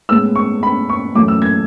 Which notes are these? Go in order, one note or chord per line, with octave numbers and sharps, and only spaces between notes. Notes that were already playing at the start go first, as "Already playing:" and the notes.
A2 G#3 B3 E6
C#6
B5
C#6
F#2 E3 A3 D6
E6
G#6